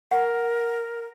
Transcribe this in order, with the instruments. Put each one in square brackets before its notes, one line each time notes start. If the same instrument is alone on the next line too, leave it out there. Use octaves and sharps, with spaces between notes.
[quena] A#4 [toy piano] F#5